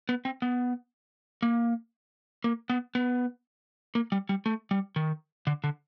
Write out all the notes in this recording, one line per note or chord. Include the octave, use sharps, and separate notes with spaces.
B3
C4
B3
A#3
A#3
B3
B3
A#3
G3
G3
A3
G3
D#3
D3
D3